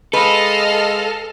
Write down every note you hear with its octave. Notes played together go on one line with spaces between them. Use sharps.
G#3 A4 B4 D#5 F5